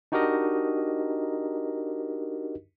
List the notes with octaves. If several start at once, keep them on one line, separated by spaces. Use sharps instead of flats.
D4 D#4 F#4 G4 A#4 D#5